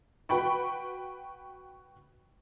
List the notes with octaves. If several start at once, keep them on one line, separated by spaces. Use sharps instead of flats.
F#4 B4 G5 B5 C#6